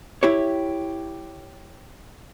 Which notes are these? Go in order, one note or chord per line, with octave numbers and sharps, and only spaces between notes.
E4 G4 C#5